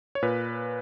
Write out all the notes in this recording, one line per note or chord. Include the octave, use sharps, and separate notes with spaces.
C#5
A#2 B4